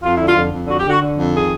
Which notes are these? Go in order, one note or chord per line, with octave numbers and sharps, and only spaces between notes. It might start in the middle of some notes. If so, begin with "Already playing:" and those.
F2 F4
D3 E4
F4
F2
F2
D3 F#4
G4
D3
F#4
D3
F2
D#3 G#4